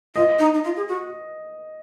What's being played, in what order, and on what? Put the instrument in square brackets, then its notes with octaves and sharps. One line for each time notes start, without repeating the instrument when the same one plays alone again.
[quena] F4 [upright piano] D#5
[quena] D#4
D#4
F4
G#4
F#4